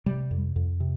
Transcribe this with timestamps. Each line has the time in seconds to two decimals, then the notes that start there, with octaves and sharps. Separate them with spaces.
0.06 C3 G3
0.31 F2
0.56 F2
0.80 C3